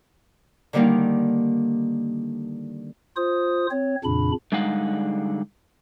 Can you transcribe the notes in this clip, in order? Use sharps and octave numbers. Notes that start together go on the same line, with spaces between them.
D3 D#3 G3 A#3 D#4
F4 C5 D#6
C4 C#5
F2 A#2 C#3 D4 B5
D3 G3 G#3 D#4 F5 F#5